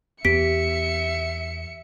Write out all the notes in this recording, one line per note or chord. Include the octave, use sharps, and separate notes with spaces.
E2 B3 G4 E5 B6 C#7 D7